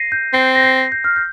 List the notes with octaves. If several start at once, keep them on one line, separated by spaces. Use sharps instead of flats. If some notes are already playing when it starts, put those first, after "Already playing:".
Already playing: A#6 C7 D#7
G6
C4 C7
A#6
C7
G6
F6
G6